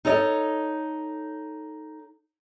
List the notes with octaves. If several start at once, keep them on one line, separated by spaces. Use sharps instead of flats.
D#4 A4 C#5 D#5